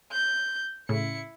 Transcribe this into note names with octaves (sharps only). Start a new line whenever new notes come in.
G6
A2 C#3 E4 C#7